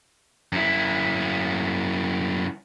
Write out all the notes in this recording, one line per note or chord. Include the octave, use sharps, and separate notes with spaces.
F#2 E4